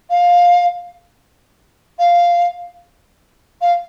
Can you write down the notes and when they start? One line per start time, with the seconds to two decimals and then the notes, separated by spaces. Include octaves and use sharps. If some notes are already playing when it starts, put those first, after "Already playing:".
0.10 F5
1.98 F5
3.61 F5